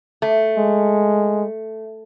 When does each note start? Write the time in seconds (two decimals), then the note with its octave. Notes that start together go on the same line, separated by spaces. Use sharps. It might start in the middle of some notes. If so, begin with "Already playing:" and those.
0.22 A3
0.58 G#3